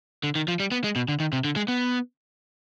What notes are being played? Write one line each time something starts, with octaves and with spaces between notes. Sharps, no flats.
D3
D#3
F3
G3
B3
G#3
B2
D3
D#3
C3
D3
G#3
B3